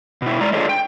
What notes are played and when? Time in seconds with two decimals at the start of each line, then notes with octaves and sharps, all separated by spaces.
0.22 B2 E4
0.41 G#3 D5 A#5
0.53 D4 F4 G#4 A4 C#5 D#5
0.69 G5